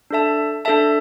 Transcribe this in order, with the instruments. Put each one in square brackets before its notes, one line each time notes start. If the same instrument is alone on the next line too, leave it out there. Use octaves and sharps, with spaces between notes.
[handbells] D4 A4 E5 A5
D4 A4 E5 A5